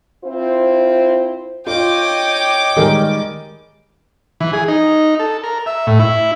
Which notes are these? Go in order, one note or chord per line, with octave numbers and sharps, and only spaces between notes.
C4 E4 F4 C5
F4 C#5 D#5 G5 D6
D#3 G3 G#3 A#4
E3
G#4
D#4
A4
A#4
E5
A2
E4